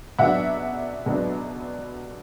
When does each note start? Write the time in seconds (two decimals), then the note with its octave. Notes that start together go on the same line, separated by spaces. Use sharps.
0.19 B2 F#3 B3 D4 E5 F#5
1.06 B2 F#3 B3 D4